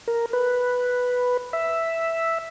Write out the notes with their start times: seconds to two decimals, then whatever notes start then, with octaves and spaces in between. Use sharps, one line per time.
0.08 A#4
0.33 B4
1.53 E5